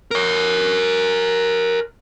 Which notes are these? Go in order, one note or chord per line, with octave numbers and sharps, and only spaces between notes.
A#4 C#5